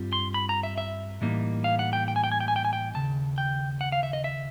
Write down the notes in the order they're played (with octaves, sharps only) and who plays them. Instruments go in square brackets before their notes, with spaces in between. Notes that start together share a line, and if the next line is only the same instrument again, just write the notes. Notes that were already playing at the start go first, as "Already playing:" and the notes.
Already playing: [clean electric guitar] G2 G3 C4 F4
C6
B5
A#5
E5
E5
A2 E3 G3 A#3 D#4
F5
F#5
G5
G5
G#5
G5
G#5
G5
G#5
G5
G#5
G5
D#2 C#3 A5
G5
F#5
F5
E5
D#5
E5